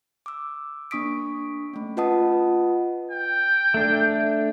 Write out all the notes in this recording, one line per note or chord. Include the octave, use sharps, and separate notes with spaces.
D6 E6
A#3 D4 C#6 D#6 B6 D7
A3 C#4
F4 B4 D#5 F#5 A5 D#6
G5
A3 D4